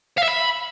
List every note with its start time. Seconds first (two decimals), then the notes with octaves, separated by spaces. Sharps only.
0.18 F5
0.23 E5
0.28 B5